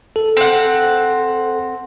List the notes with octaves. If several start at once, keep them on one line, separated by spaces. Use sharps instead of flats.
A4
C4 F#5